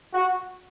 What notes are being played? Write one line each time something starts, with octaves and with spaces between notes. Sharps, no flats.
F#4